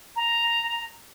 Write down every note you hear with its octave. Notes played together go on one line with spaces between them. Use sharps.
A#5